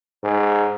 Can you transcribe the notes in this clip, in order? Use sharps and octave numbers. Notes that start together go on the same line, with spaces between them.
G#2